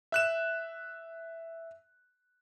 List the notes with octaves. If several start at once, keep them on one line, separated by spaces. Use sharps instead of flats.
E5 F#6 E7